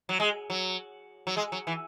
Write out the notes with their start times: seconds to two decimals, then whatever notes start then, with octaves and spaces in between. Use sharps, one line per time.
0.09 F#3
0.20 G#3
0.50 F#3
1.27 F#3
1.37 G#3
1.52 F#3
1.67 E3